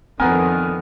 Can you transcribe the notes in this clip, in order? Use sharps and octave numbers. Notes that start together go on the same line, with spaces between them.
F2 D3 D#3 B3 C4 A#4 G#5